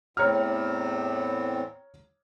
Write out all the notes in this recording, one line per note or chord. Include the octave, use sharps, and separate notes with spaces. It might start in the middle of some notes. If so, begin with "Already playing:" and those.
E2 A2 C4 C#5 A#5 F6